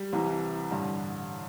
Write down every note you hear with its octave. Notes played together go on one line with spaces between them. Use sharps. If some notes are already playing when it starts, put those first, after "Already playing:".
Already playing: G3
C2 C3 E3
A1 G2 D3